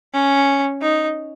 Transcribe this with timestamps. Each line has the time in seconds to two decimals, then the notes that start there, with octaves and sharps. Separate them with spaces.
0.14 C#4
0.82 D#4